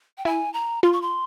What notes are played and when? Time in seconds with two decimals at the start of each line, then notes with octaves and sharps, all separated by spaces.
0.18 G5
0.25 E4 G#5
0.54 A#5
0.83 F4 C6
0.93 C#6
1.02 C6